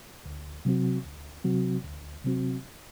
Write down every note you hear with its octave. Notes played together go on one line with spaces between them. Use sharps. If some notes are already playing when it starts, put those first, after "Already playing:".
D2
C3 F#3 C4 F#4
D2
C3 F#3 C4 F#4
D2
C3 F#3 C4 F#4